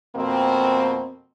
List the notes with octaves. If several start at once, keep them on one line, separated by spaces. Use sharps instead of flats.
F2 B2 A#3 C4